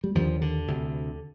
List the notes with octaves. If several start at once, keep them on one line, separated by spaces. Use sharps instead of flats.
G3
D#2 D3 F3
D3
D2 C3